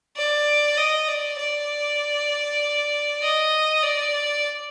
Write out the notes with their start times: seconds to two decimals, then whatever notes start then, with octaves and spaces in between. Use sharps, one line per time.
0.16 D5
0.77 D#5
1.08 D5
1.39 D5
3.22 D#5
3.83 D5